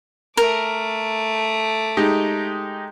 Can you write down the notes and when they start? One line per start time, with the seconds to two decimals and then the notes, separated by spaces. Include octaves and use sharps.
0.37 A3 A#4 D6
1.97 G#3 D#4 G4